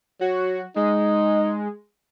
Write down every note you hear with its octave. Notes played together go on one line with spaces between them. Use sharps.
F#3 F#4
G#3 D#4